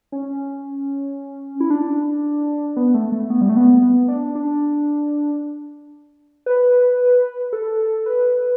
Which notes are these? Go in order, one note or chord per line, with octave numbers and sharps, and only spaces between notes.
C#4
E4
D4
B3
A3
A3
B3
G3
A3
B3
B3
D4
D4
B4
A4
B4